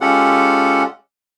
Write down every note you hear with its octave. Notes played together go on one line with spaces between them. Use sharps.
G#3 C#4 F4 G4 A4 F#5